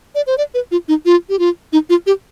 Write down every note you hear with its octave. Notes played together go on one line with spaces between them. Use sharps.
D5
C5
D5
B4
F4
D#4
F4
G4
F4
D#4
F4
G4